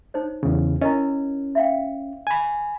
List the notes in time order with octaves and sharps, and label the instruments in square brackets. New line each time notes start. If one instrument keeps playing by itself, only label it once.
[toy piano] D#4 C5 C#5
[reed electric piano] E2 C#3
[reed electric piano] C#4 [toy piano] E4 A#4 D#5
[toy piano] E5 F5 G5
[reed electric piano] G#5 B5